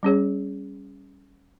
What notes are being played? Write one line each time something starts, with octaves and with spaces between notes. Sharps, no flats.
G3 C#4 G#4 C#5